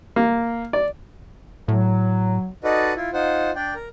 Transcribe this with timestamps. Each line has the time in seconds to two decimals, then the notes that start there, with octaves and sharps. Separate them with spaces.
0.16 A#3
0.73 D5
1.68 A2 F#3
2.64 D#4 F#4 A4 B4 D5 D#5
2.97 E4 F4
3.13 D#4 F4 C5 F#5
3.56 D4 D5 G5
3.75 A#4